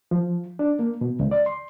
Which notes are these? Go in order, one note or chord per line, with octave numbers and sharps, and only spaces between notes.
F3
D4
A#3
B2
C#2
D5
C6